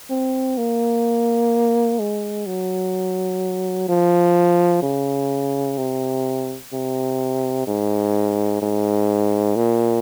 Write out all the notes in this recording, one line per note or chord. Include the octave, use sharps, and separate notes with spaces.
C4
A#3
G#3
F#3
F3
C#3
C3
C3
G#2
G#2
A#2